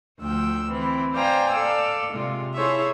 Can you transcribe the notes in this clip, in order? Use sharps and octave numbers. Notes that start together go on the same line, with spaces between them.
D2 F3 G5 E6
E3 C4
C5 D5 F5 G5 G#5 A#5
A4 D5 F5 E6
C3 G#3 F4
E4 G#4 A4 C5 C#5 E5